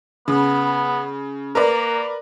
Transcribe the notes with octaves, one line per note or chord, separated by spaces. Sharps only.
C#3 B3
A#3 A#4 B4 D5